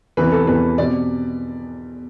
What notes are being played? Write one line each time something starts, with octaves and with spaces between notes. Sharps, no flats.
E2 C3 E3 G3 B4
A4
E2 C3 E3 G3 B4
B2 G3 C4 D5